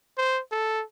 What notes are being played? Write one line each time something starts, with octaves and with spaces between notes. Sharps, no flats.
C5
A4